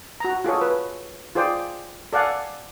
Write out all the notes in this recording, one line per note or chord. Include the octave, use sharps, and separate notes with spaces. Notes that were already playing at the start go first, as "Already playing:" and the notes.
F#4 A#5
F4 G#4 A4 C#5
B4
F4 G#4 C5 D5 G5
A4 D5 F5 F#5 G#5